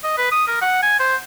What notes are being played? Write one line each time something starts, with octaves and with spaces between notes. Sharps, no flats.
D#5
B4
D#6
A#4
F#5
G#5
C5